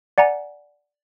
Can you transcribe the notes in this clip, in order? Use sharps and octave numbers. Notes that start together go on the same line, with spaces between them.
D5 F#5 G#5 A#5